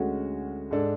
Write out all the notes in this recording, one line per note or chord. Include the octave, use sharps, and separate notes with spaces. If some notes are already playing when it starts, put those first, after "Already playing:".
Already playing: D2 D3 G#3 C#4 F#4
G#2 G#3 D4 A4